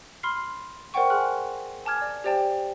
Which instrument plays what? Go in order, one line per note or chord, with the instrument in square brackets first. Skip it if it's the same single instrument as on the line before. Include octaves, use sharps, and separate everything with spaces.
[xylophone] B5 C6 F6 C7
A#4 C5 D5 F#5 G5 C#6
G#4 G#5 C6 F6 F#6
G#5 A5 D6 F6 G#6
D5
G4 C5 D5 G5 A5